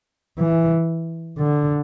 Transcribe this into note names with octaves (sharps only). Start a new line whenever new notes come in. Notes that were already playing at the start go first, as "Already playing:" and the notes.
E3
D3